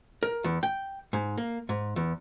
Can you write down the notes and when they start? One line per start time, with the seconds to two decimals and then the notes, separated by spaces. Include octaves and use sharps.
0.23 A#4
0.44 E2
0.63 G5
1.13 G#2
1.38 A#3
1.69 G#2
1.96 E2